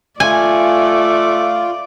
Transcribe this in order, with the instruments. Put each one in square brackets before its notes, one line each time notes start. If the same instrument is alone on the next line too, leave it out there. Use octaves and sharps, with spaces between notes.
[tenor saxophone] A3 [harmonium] F4 [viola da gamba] D5 [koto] G#5